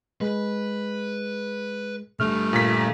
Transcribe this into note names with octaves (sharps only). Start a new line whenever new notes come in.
G#3 B4
D3 G3 A3 F6
A#2 B6